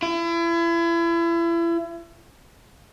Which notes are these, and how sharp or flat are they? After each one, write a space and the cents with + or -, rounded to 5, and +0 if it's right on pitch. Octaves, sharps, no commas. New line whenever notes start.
E4 +35